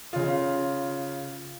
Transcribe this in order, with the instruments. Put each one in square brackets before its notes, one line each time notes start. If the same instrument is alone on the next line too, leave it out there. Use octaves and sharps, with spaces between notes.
[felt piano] C#3 F4